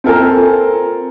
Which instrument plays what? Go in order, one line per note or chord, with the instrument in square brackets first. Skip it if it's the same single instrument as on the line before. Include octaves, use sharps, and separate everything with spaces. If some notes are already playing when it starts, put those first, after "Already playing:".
[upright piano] C4 F4 A4 A#4 G#5